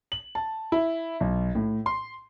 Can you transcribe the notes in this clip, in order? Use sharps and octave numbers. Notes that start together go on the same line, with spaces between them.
F#7
A5
E4
B1
A2
C6